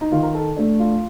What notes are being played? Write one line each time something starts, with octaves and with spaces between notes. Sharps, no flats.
D#4
D#3 F4
A#4
A4
A3 D4
F4